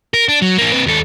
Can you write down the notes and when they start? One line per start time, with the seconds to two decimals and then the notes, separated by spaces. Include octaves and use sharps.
0.14 A#4
0.29 D4
0.42 F#3
0.58 A#3 D4
0.72 C3 B4
0.87 D#2 A4